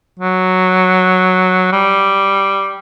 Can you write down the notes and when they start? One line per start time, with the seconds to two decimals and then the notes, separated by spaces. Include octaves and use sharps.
0.19 F#3
1.72 G3